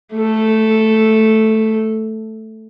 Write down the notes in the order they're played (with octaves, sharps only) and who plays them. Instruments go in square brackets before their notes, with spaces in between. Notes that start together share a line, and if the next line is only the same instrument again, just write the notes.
[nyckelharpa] A3 A4